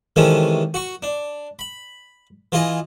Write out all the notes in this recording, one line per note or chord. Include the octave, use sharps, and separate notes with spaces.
C3 D#3 E3 G#3 A3 C#4
F#4 C#6
D4
B5
E3 F4 G#4 D#5